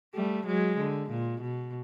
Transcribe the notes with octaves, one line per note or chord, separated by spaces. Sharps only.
G3 A3
F#3 G#3
D3
A#2
B2